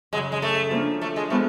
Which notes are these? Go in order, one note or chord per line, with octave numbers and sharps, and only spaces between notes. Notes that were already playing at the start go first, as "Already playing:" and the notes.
F#2 C#3 F#3 G#3
G#3
A3
F3 A#3 D4
A3
G#3
F3 G#3 A3 B3